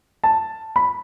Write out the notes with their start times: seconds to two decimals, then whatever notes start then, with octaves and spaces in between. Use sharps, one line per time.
0.24 A5
0.76 B5